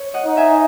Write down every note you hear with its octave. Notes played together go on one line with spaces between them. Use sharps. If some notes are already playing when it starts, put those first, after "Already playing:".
Already playing: C#5
D#5 F#5
D#4
E5 G#5